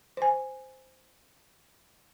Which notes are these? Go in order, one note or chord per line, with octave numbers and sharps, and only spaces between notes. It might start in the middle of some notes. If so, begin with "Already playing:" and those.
C5 G#5